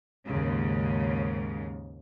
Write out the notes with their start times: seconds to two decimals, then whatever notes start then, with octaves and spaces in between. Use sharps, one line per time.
0.25 D#2 G#2 C#3